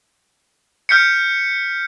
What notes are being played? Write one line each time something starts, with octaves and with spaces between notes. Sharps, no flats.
F6 G6 B6 C#7